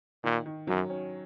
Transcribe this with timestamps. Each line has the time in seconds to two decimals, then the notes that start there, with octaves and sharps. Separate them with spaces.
0.24 A#2 D#3
0.46 D#3
0.67 F#2 F#3
0.90 C#4